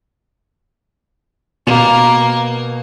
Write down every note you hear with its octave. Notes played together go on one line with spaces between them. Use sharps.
B2 A#3